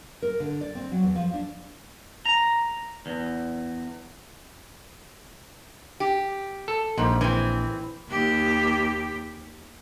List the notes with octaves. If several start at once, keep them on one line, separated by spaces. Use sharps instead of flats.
A#4
D3
D5
C4
F#3
E2
F3
D4
A#5
E2
G4
A4
A#1 G#2 G3
E3 C4
D#2 G4